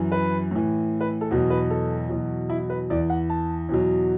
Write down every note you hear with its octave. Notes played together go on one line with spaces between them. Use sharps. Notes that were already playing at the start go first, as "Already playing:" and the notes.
Already playing: F#2 E3
B4
A2 E3
B4
A4
E2 B2 F#3 F#4
B4
A4
E2 B2 F#3
E4
B4
E2 E3 D5
F#5
A5
E2 B2 F#3